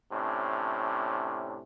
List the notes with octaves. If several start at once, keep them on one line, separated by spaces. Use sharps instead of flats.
A2 C3 C#4 D4